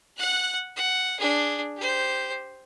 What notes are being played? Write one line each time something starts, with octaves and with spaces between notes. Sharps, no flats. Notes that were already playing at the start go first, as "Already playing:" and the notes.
F#5 F#6
F#5
D4 G#4
G4 C5